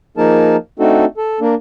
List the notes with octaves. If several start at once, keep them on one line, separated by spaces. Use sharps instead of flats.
F3 A#3 D#4 G#4 A#4 A5
A3 C4 D4 D#4 F#4 A4
A4
A#3 D4